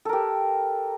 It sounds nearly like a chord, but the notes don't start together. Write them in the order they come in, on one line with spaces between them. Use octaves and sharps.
A4 A#4 G4